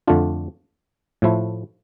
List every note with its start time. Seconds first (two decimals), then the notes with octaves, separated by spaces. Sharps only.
0.07 F2 D3 A3 D4 F4
1.22 A2 F3 A3 E4